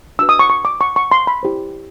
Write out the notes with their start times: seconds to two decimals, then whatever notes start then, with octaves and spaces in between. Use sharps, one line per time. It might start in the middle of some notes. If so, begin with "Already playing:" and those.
0.19 D4 F#4 B4 E6
0.29 D#6
0.39 C#6
0.50 C#6
0.65 D6
0.81 C#6
0.96 C#6
1.12 C6
1.27 B5
1.43 E4 G4 C5